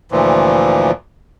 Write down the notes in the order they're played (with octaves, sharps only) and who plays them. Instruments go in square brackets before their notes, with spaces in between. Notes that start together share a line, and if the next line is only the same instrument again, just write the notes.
[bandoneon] D2 A#2 E3 F3